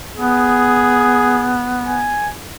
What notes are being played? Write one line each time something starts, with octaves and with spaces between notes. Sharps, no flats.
B3 G#4
G#5